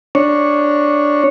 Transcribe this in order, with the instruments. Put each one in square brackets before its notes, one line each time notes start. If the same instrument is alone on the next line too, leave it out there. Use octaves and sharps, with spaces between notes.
[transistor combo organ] D4 C#5